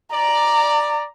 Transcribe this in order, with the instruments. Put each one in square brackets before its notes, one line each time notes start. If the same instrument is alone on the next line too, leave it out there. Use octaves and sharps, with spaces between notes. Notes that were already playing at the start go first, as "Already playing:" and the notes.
[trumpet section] D5 [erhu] A#5